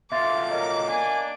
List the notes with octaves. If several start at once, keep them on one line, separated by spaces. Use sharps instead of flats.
B2 F4 A4 E5 C6 D6 A6
A#4 C#5 D#5
A#3 D4 G#5